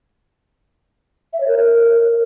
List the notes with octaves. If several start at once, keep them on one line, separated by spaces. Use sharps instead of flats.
E5
C#5
A#4